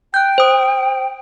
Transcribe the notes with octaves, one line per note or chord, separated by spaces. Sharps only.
G5 F#6 G6
C5 D#6